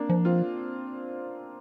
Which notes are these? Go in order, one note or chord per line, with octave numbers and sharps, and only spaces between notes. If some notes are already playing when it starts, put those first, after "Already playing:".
Already playing: A#3 D4
F3
C4 F4